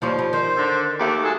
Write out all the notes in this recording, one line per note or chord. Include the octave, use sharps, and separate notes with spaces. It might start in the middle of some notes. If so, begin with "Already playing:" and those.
D#2 F3 G3 C#5
G3
D#3 C5
D3
D#2 A3 D6
F#3 G#3 G#4 A4